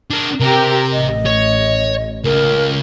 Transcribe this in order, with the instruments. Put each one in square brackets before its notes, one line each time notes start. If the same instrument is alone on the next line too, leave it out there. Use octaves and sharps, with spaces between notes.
[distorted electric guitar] D4 A#4
[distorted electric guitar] C3 [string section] G4 A#4
[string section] A1 [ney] D#5
[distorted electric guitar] C#5
[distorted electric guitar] C#2 [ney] A#4